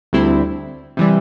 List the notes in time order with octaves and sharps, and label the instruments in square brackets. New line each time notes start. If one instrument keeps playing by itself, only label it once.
[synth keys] D2 D3 G3 C4 E4
C3 E3 G3